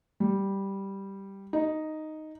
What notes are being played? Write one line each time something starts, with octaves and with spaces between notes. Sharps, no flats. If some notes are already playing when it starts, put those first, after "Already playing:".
G3
D#4